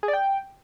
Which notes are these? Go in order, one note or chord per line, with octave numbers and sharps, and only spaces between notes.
G#4
D5
G5